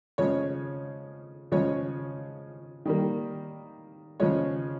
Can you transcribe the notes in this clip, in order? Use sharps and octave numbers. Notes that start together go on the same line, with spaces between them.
C#3 F3 G#3 C#5
C#3 F3 G#3 C#5
D#3 G3 A#3
C#3 F3 G#3 C#5